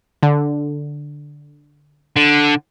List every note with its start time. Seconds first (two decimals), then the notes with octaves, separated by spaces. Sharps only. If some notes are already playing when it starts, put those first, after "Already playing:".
0.23 D3
2.16 D3